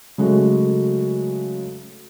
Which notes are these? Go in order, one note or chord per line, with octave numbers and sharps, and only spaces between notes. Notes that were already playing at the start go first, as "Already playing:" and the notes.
C#3 F#3 G#3 A3 F#4